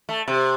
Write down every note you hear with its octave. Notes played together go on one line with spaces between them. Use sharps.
A3
C3